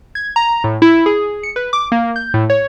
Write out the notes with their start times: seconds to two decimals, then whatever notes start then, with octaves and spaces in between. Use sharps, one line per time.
0.15 G#6
0.36 A#5
0.64 A2
0.82 E4
1.06 G#4
1.43 C#7
1.56 B4
1.73 D6
1.92 A#3
2.16 G6
2.34 A2
2.50 C#5